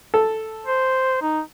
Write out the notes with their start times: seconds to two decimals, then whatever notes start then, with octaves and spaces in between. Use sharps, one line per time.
0.14 A4
0.66 C5
1.22 D#4